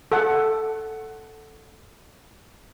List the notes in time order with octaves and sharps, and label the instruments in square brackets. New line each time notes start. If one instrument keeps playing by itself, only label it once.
[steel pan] A4 F#5